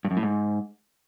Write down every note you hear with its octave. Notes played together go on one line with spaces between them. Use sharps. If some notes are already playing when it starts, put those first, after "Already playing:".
G2
F#2
A2
G#2